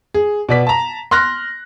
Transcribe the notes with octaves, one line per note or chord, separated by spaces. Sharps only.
G#4
B2 D5 B6
A5 A#5
C6 F6 F#6 A#6